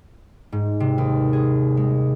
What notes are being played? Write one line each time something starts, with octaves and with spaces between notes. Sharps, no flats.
G#2
C3
D#2
G#4
G#3